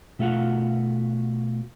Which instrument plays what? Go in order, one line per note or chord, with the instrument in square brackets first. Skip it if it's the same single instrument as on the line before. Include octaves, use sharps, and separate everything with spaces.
[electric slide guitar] B2 A3 F4 F#4 F5 F#5